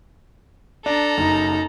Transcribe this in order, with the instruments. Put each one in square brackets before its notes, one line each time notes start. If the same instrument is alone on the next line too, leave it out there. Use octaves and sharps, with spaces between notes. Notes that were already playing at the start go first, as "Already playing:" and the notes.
[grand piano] D4 [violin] A4 A#5
[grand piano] F#1 [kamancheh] D#4